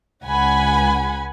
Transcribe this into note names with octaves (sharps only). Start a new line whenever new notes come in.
C#2 F#5 G#5 B5